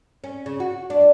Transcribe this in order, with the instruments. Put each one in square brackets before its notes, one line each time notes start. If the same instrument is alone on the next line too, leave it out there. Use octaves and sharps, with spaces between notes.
[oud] C#4
C#3
F#4
D4